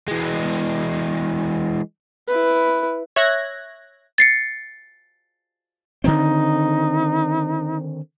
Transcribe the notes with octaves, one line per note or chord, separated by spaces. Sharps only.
E3 G#3
E4 B4
C#5 E5 F#6 G#6 A#6
A6 C7 C#7
D3 D#3 C4 D#4